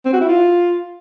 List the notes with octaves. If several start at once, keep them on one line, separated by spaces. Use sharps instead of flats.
C4
F#4
E4
F4